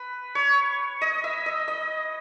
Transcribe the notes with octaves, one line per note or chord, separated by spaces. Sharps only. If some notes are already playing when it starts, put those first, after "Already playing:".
Already playing: B4
C#5
D#5
E5
D#5
D#5